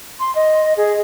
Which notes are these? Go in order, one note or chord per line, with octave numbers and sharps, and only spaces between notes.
C6
D#5
G#4